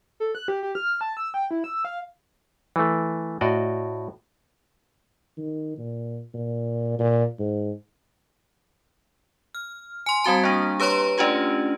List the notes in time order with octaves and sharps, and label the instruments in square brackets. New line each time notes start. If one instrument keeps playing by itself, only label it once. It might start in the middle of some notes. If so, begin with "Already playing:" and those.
[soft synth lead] A4
F#6
G4
G4
F6
A5
E6
G5
E4
E6
F5
[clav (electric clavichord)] E3 A3
A2 F#4 D5 D#5
[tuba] D#3
A#2
A#2
A#2
G#2
[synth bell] F6
G#5 C6
G3 C4 F#4 A5
A#3 D4
G4 B4 C#5 A#5 C6
A3 C#4 D4 F4 G4